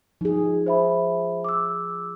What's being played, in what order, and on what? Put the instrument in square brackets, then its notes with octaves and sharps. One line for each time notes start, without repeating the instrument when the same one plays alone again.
[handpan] F3 G#4 [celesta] D#4
[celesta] C5 E5 B5
D6 E6